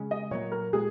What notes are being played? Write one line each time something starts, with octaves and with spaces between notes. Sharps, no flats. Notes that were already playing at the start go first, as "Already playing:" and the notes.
Already playing: C#3 G#3 C#4
D#5
A#2 F#3 A#3 C#5
A#4
A#2 G#3 G#4